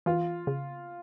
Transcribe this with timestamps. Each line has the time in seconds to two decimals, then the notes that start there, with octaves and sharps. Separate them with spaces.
0.06 E3 F4
0.47 C#3